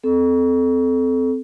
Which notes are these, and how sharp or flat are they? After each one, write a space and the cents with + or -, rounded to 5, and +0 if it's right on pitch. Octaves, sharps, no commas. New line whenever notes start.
C4 -20 A4 -20